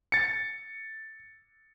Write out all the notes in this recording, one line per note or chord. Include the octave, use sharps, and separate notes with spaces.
A6 C#7